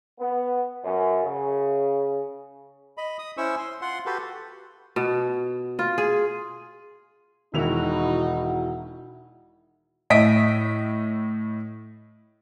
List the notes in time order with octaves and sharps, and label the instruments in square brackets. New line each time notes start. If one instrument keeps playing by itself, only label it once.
[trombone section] B3
F#2
C#3
[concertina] D#5 B5
D#6
C#4 E4 C5 C#6 E6
C6
F4 F#5 C6
F#4 G4 A4 B4
[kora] B2
F4
G#4
[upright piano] E1 D#3 F7 [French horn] D#4 [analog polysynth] E4 F#4
[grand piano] A2 D#5 E5 B6 D7